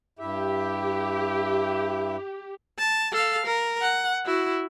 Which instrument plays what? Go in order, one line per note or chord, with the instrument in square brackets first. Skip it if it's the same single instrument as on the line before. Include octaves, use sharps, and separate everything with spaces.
[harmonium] G2 E4 E5 [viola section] G4
[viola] A5
A4 F5
A#4
F#5
E4 F#4